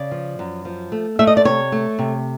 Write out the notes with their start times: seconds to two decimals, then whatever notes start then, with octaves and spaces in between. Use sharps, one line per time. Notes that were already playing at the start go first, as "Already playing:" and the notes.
Already playing: C#3 D5
0.11 F3
0.39 F#2
0.65 F3
0.92 A3
1.19 A3 E5
1.27 D#5
1.37 D5
1.45 C3 C#5
1.72 A3
1.99 C3